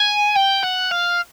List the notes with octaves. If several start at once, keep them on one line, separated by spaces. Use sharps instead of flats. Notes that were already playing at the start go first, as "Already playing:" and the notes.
Already playing: G#5
G5
F#5
F5